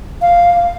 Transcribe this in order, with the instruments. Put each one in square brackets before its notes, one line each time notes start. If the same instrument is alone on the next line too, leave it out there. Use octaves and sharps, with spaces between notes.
[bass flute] F5